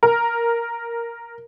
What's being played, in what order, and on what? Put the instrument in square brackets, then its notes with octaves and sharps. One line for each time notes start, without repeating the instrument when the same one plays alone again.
[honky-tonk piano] A#4